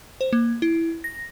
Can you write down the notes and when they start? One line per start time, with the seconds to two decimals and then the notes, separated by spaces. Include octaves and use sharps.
0.21 C5
0.33 A#3
0.62 E4
1.04 A#6